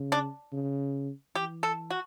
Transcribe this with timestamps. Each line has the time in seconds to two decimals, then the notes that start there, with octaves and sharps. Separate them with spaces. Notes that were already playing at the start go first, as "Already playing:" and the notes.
Already playing: C#3
0.12 D4
0.52 C#3
1.35 E3 G4
1.63 A4
1.90 F#4